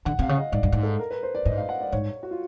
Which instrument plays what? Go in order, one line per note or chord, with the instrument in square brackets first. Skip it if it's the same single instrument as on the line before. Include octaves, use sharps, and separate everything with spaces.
[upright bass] D3 [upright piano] F#5
[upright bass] C3 [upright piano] F5
[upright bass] C#3
[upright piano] D#5
[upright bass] G#2 [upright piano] D5
[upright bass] G2
G#2
[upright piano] A4
A#4
B4
C5
D5
[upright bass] G#2 [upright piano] D#5
[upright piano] F5
F#5
D5
[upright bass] G#2 [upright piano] C#5
[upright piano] F#4
F4